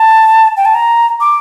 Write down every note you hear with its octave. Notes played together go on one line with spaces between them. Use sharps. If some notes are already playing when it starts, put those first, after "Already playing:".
Already playing: A5
G5
A5
A#5
D6